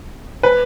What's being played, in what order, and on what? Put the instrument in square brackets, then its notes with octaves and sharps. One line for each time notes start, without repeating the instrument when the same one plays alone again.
[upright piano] B4